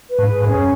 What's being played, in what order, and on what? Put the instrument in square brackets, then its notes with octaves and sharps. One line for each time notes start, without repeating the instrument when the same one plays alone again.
[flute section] B4
[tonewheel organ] G#2
[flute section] G#4
[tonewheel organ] F#2 [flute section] C#4